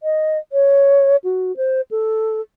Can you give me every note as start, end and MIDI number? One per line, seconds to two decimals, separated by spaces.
0.03 0.38 75
0.52 1.16 73
1.24 1.55 66
1.57 1.81 72
1.91 2.41 69